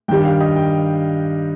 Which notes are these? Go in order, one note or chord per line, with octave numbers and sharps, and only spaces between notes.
G2 D#3 G3 G5
F5
D#5
G5